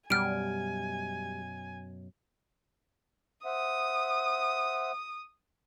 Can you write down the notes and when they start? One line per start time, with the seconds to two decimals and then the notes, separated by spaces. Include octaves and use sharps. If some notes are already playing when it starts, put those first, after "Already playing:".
0.10 F#2 B2 G3 G#5 F6 D7
3.45 C5 E5 F#5 D#6